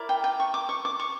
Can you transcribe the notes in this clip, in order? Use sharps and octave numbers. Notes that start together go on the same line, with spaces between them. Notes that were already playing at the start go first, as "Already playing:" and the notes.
Already playing: E4 A#4 D5
G5
G5
C#6
D6
C#6
D6
C#6